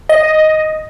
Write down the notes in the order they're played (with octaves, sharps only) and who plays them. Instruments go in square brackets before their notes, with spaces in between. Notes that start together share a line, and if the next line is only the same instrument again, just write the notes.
[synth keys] D#5